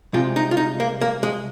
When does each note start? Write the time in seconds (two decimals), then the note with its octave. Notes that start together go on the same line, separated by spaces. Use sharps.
0.13 C2 C3 G#3 F4
0.36 D#4
0.51 F4
0.57 D#4
0.80 A#3
1.01 A#3
1.23 G#3